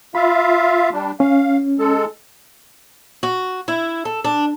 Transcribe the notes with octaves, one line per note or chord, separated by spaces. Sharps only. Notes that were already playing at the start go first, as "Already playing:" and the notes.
F4 E5 F5 B5
G3 D4
C#4 F5
G#3 A4
F#4
E4
A4
D4